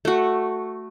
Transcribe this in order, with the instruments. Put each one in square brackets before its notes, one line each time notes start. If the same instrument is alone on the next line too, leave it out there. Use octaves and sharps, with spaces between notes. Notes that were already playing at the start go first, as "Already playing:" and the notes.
[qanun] A3 F#4